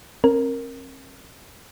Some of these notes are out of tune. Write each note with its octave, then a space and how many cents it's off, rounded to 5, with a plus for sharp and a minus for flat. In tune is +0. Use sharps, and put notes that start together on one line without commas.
C4 +45 A#4 +0